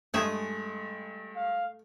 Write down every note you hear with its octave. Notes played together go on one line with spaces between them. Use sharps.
G2 G#3 A3 G#4 E5
F5